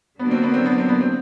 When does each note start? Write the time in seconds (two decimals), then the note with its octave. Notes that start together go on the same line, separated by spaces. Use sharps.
0.19 D3 F#3 A#3 B3 D4 F#4
0.31 C4
0.43 B3
0.54 C4
0.66 B3
0.78 C4
0.89 B3
1.01 C4